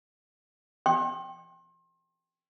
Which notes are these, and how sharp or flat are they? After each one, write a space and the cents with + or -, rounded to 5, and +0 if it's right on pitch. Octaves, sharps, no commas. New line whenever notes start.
G5 +0 C6 +35